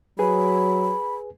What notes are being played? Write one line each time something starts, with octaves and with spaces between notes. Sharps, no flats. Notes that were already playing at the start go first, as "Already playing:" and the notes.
F#3 G#4 B4 G#5 B5